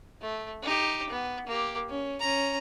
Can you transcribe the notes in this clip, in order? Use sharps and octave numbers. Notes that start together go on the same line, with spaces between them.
A3
D#4 G4
B3
A#3 G4
C#4
C#4 A#5